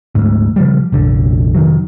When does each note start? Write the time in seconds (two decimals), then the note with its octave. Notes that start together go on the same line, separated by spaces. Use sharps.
0.15 D2 G#2
0.56 C#3 F3 G3
0.92 F1 A#1 D3
1.55 F1 D#3 F#3